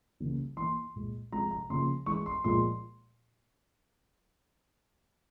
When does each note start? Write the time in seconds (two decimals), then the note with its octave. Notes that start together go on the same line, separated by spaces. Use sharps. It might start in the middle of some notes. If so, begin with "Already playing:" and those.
0.20 C#3 E3 G3 A#3
0.57 E3 A#3 C6
0.96 A#2 G#3
1.32 C3 F3 G#3 A#5
1.51 A#5
1.70 C#3 F3 A#3 C6
2.06 E3 G#3 C#6
2.26 C6
2.44 A#2 F3 G#3 C6